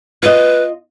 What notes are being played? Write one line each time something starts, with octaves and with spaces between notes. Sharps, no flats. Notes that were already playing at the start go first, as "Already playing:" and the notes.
F4 B4 D#5